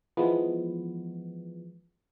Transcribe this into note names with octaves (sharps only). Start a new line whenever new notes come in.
E3 F3 G#3 B3